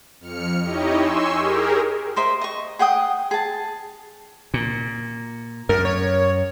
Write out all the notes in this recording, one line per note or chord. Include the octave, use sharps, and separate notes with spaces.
F2 F6 C#7
D#4 E4 G4 C#5 D#5
G#5 C6 C#6 E6
G4 G#4 A#4
A#4 C5 D#5 E5
D#5 C#6
G#4 F#5 G5 D#6
G#4 A5
A#2
F#2 A#4
C#5